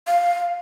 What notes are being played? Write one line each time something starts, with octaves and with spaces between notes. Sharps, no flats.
F5